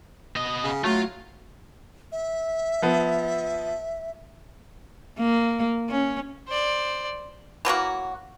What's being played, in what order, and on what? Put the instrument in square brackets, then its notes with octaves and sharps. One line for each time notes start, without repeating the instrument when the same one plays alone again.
[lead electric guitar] B3 D#5
[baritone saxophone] C#3
[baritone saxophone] F#3 [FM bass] A3 [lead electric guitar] F4
[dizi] E5
[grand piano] F3 B3
[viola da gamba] A#3
C#4
[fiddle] C5 D5
[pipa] E3 F#3 A#3 F#4